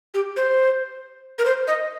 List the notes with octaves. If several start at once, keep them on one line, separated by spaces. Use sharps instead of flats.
G4
C5
A#4
C5
D#5